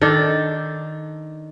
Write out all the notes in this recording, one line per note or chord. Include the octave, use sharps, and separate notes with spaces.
D#3 D4 A4